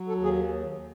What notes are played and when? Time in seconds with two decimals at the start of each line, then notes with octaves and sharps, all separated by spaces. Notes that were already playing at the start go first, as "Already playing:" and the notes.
Already playing: F#3
0.08 A4
0.16 D#2
0.24 G#4